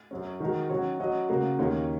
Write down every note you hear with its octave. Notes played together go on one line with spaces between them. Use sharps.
F#2 F#3 C#4
D#3 G#3 F#4 A#4
D#3 F#3 C#4 F#4 C#5
F#3 C#4 F#4 D#5
C#3 A#3 F#4 A#4
D#2 D#3 A#3 C#4